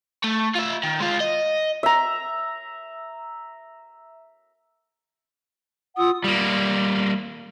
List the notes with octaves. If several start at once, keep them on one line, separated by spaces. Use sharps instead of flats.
A3
F4 E5
D#3
G#3 F4
D#5
E5 A#5
F4 F#5 D#6 E6
G3 A#3